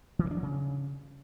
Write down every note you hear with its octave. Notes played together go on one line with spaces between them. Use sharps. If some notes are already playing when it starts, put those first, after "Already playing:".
E3
A#3
D4
F#3
C#3